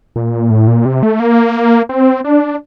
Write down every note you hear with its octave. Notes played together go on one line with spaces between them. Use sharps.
A#2
A2
A#2
C3
A3
A#3
C4
D4